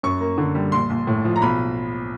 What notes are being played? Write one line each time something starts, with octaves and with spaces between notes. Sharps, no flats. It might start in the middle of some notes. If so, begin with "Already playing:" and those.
F#2 C#6
A#3
D3
G3
A#1 C6
A#1
A2
F3
A#5
B1 B5